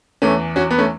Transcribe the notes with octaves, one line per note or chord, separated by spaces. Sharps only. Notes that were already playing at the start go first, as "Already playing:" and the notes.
E2 E3 A3 C#4
C#4 F#4
B3
A3 C#4